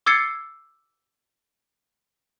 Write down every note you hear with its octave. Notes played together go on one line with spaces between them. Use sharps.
D6 E6 G#6 A6 C7 C#7